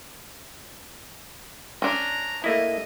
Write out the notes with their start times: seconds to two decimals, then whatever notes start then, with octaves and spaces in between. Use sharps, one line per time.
1.82 C#4 D4 A#5
2.44 A3 A#3 E4 D#5